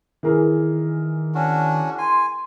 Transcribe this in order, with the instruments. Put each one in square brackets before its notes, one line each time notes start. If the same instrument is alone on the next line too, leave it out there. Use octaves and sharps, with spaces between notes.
[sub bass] D#3 [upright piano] E3 G#4 A#4
[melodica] C#4 D4 F#4
[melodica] G#5 [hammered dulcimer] C6